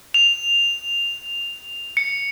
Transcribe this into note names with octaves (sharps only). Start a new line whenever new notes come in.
F7
C#7